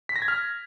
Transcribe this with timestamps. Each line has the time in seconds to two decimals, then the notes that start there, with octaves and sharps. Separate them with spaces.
0.09 B6
0.16 A#6
0.22 G#6
0.28 F6